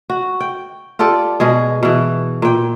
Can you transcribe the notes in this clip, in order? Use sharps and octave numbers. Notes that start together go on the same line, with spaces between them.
F#4
G5
F4 G4 A4 D5
B2 G#3 G#4
B2 E3
A#2 G5